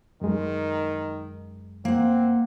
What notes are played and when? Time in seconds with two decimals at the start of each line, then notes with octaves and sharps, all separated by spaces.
0.21 F#2 D#3 G#3
1.85 A#3 C4 F#5